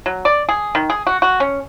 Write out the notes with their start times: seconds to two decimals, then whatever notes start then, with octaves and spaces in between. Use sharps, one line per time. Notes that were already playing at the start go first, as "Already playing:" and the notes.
0.06 F#3
0.25 D5
0.49 G#4
0.75 D#3
0.90 G#4
1.07 F#4
1.22 F#4
1.40 C#4